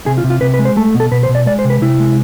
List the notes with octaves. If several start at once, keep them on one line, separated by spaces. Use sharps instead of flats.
C3 G#4
F4
C3
F4
C3 B4
B4
G#3
C5
A3 A4
B2
A4
B2 B4
C5
B2
D5
G#3 D5
C5
C3
B4
C3 E4
G#3